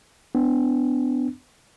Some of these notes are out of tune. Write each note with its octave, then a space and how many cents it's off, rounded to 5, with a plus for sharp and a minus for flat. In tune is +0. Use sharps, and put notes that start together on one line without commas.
B3 +30 D4 +0